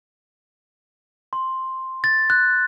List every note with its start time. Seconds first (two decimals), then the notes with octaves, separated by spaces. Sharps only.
1.33 C6
2.04 A6
2.30 F#6